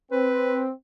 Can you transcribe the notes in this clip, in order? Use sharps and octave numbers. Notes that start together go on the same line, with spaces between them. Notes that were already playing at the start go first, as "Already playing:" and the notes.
C4 B4